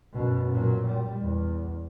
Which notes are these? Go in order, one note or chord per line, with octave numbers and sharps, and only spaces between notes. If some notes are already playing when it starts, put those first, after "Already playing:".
F#2 B2
A#2 F#3
G3
E2